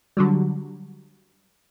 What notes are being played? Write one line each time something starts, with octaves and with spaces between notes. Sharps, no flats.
D3 F#3 G3